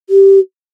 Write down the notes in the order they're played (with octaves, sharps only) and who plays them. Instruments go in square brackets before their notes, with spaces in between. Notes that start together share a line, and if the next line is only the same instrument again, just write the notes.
[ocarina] G4